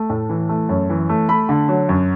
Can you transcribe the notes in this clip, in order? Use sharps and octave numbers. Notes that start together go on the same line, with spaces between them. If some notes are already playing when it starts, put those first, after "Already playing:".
Already playing: A3
A2
E3
A3
F#2
E3
A3
A3 B5
D3
F#3
F#2